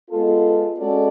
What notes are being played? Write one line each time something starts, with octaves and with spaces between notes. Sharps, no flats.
G#3 B3 F4 A4
G#3 C#4 F#4 A4 D5